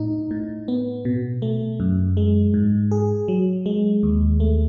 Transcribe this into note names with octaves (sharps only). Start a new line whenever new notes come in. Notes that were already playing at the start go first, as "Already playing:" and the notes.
Already playing: A2 D#4
A2
B3
B2
A3
F#2
G#3
G#2
G#4
F#3
G#3
D#2
A3